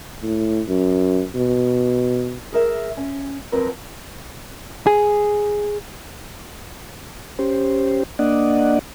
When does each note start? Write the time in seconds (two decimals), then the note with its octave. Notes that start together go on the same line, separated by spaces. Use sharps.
0.23 A2
0.68 F#2
1.35 B2
2.53 G#4 A#4 E5
2.97 C#4
3.52 F2 F#3 C4 A#4 B4
4.87 G#4
7.39 C#4 G4 C5
8.19 A#3 D4 D5 D#5 F#5